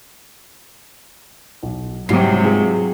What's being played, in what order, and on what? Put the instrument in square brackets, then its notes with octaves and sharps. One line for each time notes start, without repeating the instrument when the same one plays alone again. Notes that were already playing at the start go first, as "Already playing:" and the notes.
[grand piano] B1
[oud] G#2 [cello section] C3 F#3 [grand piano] G3 C7
[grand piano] F4 G#4 B4